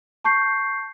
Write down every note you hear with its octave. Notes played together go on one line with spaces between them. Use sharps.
A5 C#6 G6 C7